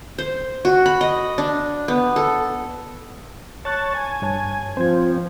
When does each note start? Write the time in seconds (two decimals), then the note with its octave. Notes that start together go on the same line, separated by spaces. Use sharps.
0.18 C5
0.65 F#4
0.86 B5
1.01 D#5
1.38 D4
1.88 B3
2.16 A4
3.65 C#5 A5 C#6 F#6 A6
3.94 G#5
4.22 G2 C#5 A5
4.77 F3 C4 C5 G#6